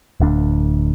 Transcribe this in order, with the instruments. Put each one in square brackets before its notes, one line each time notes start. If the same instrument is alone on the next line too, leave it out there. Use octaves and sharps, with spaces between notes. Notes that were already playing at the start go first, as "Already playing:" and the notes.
[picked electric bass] D1 D2 D4